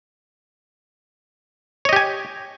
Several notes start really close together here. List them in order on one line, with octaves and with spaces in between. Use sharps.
C#5 D#5 G4 G#5